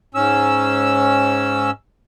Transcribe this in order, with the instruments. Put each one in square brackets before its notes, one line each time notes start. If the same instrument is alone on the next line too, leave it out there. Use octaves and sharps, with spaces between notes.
[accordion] G#2 C#4 E6